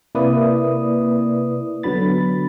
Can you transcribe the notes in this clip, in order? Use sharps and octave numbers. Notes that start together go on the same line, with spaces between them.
C3 A#3 E4 B4 D5 D#6
D3 F#3 B3 B5 A6